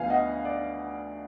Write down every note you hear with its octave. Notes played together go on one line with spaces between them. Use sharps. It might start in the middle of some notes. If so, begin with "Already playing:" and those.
Already playing: D2 D3 F3 B3 F5 G#5
D#5 F#5
D5